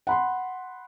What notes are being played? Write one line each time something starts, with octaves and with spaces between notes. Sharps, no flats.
F#5 B5 C6